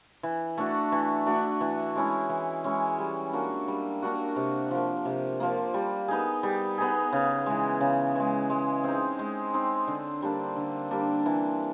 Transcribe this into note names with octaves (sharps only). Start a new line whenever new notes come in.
E3
A3 D4 F#4
E3
A3 D4 F#4
E3
G#3 C#4 E4
E3
G#3 C#4 E4
G3
A#3 D4 F#4
G3
A#3 D4 F#4
C3
F3 A#3
C3
F3 A#3
G3
B3 D#4 G#4
G3
B3 D#4 G#4
C#3
E3 G#3
C#3
E3 G#3
G#3
C4 D#4
G#3
C4 D#4
D3
G3 A#3 D4
D3
G3 A#3 D4
E3